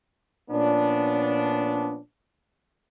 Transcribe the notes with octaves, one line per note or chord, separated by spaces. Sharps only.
A#2 F3 B3 C#4 D4